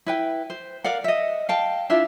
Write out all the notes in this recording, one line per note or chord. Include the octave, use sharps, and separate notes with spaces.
E4 B4 G5
C5
A#4 D5 F5 F#5
D#5 E5
F5 G5 A5
D4 E4 F4 E5